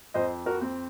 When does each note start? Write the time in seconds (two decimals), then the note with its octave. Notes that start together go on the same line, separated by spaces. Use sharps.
0.14 F2 C5 D#5
0.46 F#4 A#4
0.61 C4